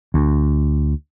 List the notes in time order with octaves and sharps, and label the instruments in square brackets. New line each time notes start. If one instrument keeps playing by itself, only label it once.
[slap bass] D2